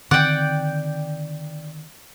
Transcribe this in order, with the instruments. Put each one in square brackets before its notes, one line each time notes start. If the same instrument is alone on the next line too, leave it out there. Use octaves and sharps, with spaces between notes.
[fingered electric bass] D3 D#3 C4 [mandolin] D5 G5 [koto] F#5